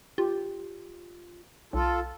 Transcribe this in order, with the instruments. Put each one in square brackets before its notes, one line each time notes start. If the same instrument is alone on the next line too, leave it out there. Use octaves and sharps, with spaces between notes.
[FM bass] F4 [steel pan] G4
[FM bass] B1 [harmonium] F4 A4